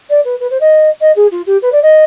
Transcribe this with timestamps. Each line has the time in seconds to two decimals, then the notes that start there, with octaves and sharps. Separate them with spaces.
0.09 D5
0.24 B4
0.40 B4
0.50 C5
0.60 D#5
1.01 D#5
1.16 G#4
1.31 F4
1.46 G4
1.62 B4
1.72 D5
1.82 D#5